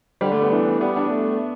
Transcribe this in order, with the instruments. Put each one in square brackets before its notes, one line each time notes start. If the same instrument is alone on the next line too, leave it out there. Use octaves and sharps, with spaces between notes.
[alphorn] D3 [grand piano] G3
[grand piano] A3
B3
[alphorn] E3 [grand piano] D4
[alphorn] G3 [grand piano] B3
[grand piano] D4
[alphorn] A3